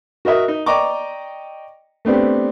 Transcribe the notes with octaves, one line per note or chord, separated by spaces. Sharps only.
F#4 A#4 D#5 E5 D#6
D#4
D5 D#5 G5 A#5 C#6 D6
A3 B3 C4 D4 G4